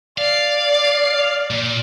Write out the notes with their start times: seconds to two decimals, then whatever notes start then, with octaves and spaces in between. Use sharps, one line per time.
0.18 D5 F5
1.50 A#2